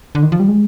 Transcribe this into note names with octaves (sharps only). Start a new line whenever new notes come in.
D3
D#3
F3
G3
G#3